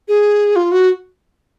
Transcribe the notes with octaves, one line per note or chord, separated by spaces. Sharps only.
G#4
F4
F#4